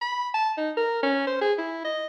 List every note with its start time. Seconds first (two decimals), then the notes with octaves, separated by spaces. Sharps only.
0.01 B5
0.34 A5
0.58 D#4
0.77 A#4
1.03 C#4
1.27 C5
1.41 G#4
1.58 E4
1.85 D#5